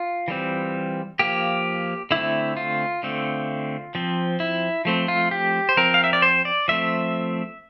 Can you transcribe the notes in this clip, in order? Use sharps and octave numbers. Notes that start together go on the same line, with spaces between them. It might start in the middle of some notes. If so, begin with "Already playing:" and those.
Already playing: F4
E3 G3 C4
F3 A#3 G4
D3 A3 C4 E4
F4
D3 A3 C4
F3 C4
E4
F3 A3 C4
F4
G4
C5
F3 C4 A#4
F5
E5
D5
C5
D5
F3 A3 C4 E5